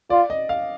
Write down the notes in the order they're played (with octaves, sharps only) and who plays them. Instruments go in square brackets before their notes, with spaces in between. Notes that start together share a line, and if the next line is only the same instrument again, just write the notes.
[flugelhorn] F4 [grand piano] D5
[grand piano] D#5
F5